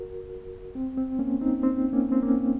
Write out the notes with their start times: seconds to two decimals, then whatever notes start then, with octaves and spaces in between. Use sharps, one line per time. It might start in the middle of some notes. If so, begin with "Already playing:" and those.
Already playing: F#4 A#4
0.75 C4
0.98 C4
1.19 A#3 C#4
1.41 C4 D#4
1.63 C4
1.93 A#3 C#4
2.12 C4
2.22 A#3 C#4